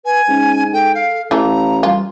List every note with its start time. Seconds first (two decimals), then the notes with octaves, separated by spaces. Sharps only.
0.05 B4 G#5
0.29 G#2 C#4
0.73 A4 G5
0.95 F5
1.31 A1 E3 A3 F5 A#5
1.83 G3 F4